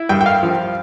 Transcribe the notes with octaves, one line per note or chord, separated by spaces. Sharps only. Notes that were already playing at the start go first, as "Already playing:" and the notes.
Already playing: E4
G2 G5
G5
F5
F3